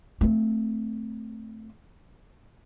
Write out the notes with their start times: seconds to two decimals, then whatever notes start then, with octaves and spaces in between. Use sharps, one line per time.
0.21 A3 C4